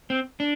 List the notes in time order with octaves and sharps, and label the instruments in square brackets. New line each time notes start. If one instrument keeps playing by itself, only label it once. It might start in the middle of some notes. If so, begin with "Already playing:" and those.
[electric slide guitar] C4
D4